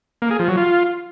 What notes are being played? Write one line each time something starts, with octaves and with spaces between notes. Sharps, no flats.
A#3
G#4
F3
F#3
F4